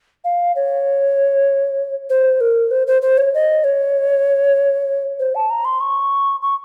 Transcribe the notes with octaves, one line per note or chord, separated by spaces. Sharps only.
F5
C#5
C5
A#4
C5
C5
C5
C#5
D#5
C#5
C5
A5
A#5
C6
C#6
C#6